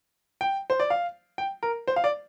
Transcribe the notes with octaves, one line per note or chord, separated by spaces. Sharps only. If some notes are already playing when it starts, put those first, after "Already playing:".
G5
C5
D5
F5
G5
A#4
C5
F5
D5